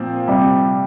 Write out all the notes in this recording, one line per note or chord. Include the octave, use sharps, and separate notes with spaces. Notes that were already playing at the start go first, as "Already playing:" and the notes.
Already playing: A#2 F3 C4
C3 G3